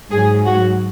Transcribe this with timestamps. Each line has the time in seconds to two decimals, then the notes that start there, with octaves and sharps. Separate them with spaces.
0.11 G#2 F#3 G#4
0.46 F#4